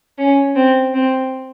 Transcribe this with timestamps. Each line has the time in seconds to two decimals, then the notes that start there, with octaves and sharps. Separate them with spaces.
0.18 C#4
0.56 C4
0.94 C4